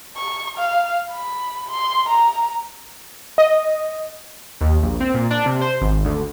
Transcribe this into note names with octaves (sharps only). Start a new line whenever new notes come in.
C#6
F5
B5
C6
A#5
D#5
D#2
A#1
C4
A#2
D4
C3
C5
G#1
D2